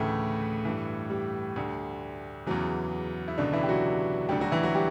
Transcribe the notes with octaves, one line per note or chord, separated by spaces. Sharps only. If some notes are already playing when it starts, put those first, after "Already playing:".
Already playing: D2 A2 C#3 E3 A3
G2 E3
G3
D2 D3
E2 C#3 E3 F#3
E4
C#2 B2 D3 D4
E3 E4
G4
F#3 F#4
D2 D3 G3 G4
F#3 F#4
E3 E4
F#3 F#4
G3 G4